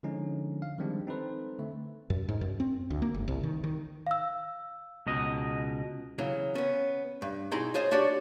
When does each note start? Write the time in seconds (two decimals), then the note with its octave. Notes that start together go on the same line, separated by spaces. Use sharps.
0.03 D3 F3 G#3 C#4 D#4
0.62 F5
0.78 D#3 F3 G3 G#3 C4 D4
1.07 C4 D#4 A4 B4 C5
1.58 D3 A3 C4
2.10 F#2
2.29 G#2
2.41 F#2
2.60 C4
2.90 D2
3.02 A#3
3.14 G1
3.28 C2
3.43 D#3
3.64 D#3
4.07 F5 E6
5.07 C#2 B2 D#5
6.18 C#3 E3 F#3
6.55 B3 C#4
7.22 G2
7.51 B2 D#4 E4 G#4 A#5 C6
7.74 F4 G#4 C5 C#5 D#5
7.91 D4 F#4 G4 C#5 D5